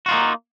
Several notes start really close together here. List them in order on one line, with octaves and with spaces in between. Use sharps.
F#4 F4 D#4 A#3